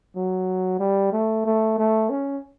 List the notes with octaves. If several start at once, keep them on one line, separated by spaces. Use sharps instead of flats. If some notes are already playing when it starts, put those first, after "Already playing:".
F#3
G3
A3
A3
A3
C#4